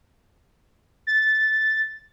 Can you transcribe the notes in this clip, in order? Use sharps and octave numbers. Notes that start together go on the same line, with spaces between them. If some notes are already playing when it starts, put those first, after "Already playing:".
A6